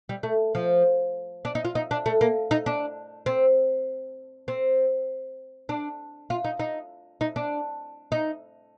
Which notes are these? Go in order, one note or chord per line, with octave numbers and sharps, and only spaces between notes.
G3
A3
F3
D4
D#4
F4
D#4
D4
A3
A#3
D#4
D4
C4
C4
D4
F4
D#4
D#4
D#4
D4
D#4